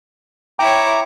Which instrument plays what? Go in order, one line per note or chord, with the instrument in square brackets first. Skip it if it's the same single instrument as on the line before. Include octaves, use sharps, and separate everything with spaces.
[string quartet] E4 C#5 [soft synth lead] G5 [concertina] A#5 D6